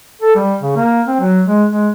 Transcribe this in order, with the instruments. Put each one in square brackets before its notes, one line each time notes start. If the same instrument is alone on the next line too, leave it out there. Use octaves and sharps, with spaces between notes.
[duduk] A4
G3
C#3
A#3
C4
F#3
G#3
G#3